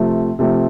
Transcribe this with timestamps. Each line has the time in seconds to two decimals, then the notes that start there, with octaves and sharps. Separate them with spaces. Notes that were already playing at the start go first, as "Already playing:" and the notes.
Already playing: C3 F3 A3 C4
0.39 C3 F3 A3 C4